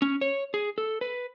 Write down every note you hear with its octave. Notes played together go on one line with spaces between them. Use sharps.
C#4
C#5
G#4
A4
B4